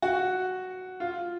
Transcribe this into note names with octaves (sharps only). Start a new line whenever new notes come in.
F#4
F4